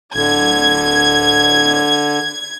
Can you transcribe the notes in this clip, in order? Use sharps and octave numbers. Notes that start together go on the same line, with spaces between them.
D1 D3 G#6